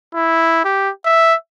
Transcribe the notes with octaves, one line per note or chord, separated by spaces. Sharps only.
E4
G4
E5